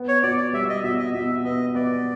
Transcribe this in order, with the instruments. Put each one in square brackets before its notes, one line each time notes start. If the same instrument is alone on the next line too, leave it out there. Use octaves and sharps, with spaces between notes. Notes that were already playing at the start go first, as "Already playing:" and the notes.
Already playing: [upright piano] B3
[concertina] C#5
[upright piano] B2 [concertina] D5
[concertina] D5
[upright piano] G3 [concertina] E5
[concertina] D#5
[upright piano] B2 [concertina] E5
[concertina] D#5
[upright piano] B2 [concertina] E5
[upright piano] B3 [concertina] D#5
[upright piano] B3 [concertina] D5